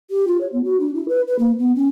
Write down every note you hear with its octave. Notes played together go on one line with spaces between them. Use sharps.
G4
F4
C#5
B3
F#4
D4
E4
B4
B4
A#3
B3
C#4